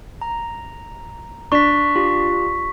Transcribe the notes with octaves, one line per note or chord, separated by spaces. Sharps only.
A#5
D4 C#6 B6
F4 G4